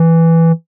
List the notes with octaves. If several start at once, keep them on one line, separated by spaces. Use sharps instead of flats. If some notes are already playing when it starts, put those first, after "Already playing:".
Already playing: E3